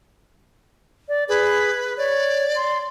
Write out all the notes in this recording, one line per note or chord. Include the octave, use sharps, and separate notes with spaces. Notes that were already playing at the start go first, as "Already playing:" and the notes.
D5
G#4 B4
C#5 D5
C6